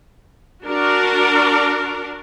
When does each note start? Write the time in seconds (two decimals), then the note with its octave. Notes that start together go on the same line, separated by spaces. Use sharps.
0.64 D4 F#4 A#4